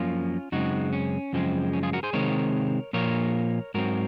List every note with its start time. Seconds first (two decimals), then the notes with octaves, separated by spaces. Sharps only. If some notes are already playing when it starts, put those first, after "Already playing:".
Already playing: F#2 F3 A#3 C#4 F4
0.52 F#2 C#3 G#3 C4 D#4 F#4
0.93 C#4
1.33 F#2 C#3 F3 G#3 C4
1.73 C#4
1.83 F4 G#4
1.93 F#4 A#4
2.03 G#4 C5
2.13 C3 D#3 G#3 C4 A#4 C#5
2.93 A#2 F3 A#3 A#4 C#5
3.74 G#2 F#3 C4 F#4 A#4